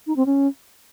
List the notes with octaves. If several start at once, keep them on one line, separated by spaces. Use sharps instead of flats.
D#4
C4
C#4